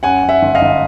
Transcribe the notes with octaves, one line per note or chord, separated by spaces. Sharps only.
F#2 F#5 G#5
F#2
E5 F#5
G1
D#5 F5
G1